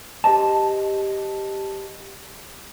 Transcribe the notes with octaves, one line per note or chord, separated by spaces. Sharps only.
G4 C5 D#5 A5